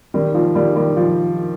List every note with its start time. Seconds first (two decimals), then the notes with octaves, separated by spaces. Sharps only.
0.14 D#3 G3
0.34 F3
0.55 D#3 G3
0.76 D#3 G3
0.97 F3